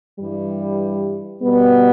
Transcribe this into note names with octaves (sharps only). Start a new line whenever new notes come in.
G2 E3 G3
B2 G3 B3